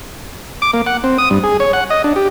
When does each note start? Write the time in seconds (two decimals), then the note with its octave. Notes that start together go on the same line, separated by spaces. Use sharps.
0.62 D6
0.74 A#3
0.86 F#5
1.04 C4
1.18 D#6
1.31 G2
1.44 G#4
1.60 C#5
1.73 F#5
1.90 D#5
2.04 D4
2.16 G4